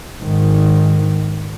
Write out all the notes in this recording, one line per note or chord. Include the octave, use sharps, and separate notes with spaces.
G#2 D#3